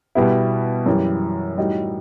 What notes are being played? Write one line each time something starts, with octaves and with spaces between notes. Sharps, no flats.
B2 G3 B3 E4
F#2 E3 G3
A2 G3 D#4 F#4